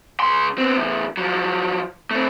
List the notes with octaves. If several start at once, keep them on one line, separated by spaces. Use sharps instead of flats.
C#2 C6
B3 C4
E2 A2
F3 F#3
A3 C4